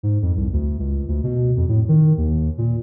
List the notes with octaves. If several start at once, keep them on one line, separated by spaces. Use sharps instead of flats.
G#2
F2
C2
D2
C#2
D2
B2
F2
A2
D#3
D#2
A#2